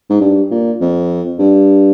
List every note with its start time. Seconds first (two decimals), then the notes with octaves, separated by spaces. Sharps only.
0.10 G#2
0.21 G2
0.51 A#2
0.81 F2
1.39 G2